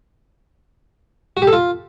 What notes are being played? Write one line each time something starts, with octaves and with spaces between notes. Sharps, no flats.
F#4
G4
A4
F4